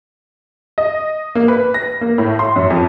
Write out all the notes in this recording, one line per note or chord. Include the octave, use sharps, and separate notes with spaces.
D#5
A#3
B4
A#6
A#3
A2
C6
F#2
F2